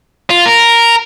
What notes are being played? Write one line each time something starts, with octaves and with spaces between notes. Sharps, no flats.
F4
A#4